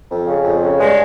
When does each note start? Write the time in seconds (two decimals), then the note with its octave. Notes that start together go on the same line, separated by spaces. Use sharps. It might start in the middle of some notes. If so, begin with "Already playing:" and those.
0.10 F2
0.27 C#3
0.45 F2
0.62 C#3
0.79 G2 G#3